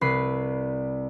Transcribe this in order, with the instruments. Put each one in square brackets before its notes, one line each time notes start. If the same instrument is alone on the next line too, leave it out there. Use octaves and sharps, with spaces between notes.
[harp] C2 B4 B5 C7